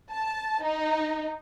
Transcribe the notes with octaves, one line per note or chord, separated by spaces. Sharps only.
A5
D#4